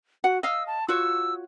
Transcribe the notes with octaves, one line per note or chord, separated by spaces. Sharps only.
F#4 F#5
D#5 F5 E6
A5
F4 F#4 C#5 E6